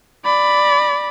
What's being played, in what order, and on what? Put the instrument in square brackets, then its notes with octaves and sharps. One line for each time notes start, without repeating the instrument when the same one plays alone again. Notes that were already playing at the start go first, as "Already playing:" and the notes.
[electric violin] D5 B5